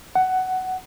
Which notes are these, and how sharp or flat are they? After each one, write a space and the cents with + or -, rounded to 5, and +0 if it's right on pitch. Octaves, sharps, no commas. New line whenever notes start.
F#5 +15